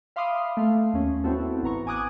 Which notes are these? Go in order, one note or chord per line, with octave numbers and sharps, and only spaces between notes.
E5 F5 B5 C6 D6 D#6
A3 F5
D#2 C#4
B3 C4 E4 F#4 A4
A1 B3 A#5 C#6
G#5 D6 D#6 F#6 G#6